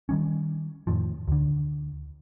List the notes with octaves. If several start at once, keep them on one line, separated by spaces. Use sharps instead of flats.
D#3 G3 C#4
F2 A2 D#3 F3
D2 D3